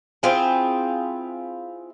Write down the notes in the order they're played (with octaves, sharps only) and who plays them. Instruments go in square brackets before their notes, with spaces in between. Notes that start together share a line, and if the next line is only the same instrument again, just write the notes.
[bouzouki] C4 E4 F4 G#4